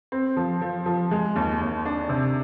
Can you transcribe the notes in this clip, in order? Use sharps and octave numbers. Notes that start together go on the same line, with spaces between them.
C4
F3
F3
F3
G#3
D#2
D#2
D4
C3